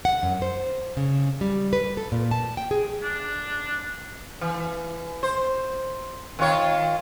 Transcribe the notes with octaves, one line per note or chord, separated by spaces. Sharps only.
F#5
F#2
C5
C#3
G3
B4
A4
A#2
A5
G5
G#4
D4
E3
C5
D#3 F4 C#5